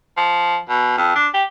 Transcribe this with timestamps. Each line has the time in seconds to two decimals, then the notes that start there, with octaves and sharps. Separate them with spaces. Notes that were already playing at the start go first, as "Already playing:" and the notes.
0.17 F3
0.69 B2
0.98 F2
1.15 D4
1.34 G4